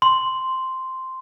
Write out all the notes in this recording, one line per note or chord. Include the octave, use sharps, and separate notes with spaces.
C6